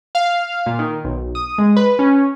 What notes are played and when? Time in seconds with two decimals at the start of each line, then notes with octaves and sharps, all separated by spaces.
0.15 F5
0.66 A#2
0.79 D#3
1.04 B1
1.35 D#6
1.58 G#3
1.76 B4
1.99 C#4